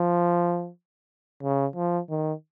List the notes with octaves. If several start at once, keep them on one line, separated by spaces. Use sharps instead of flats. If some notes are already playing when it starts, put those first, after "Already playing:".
Already playing: F3
C#3
F3
D#3